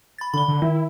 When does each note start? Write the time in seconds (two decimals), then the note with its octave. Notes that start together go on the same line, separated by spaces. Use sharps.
0.18 B5 A6
0.34 D3 B5 G7
0.48 D3
0.62 D#3 E4